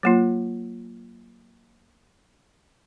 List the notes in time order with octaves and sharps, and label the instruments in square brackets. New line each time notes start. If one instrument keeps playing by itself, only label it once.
[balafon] F#3 A#3 F4